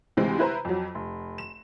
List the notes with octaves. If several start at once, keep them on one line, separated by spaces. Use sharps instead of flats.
D2 C3 E3 G#3 C4
E4 B4 C5 A#5
F2 F#3
F1
E7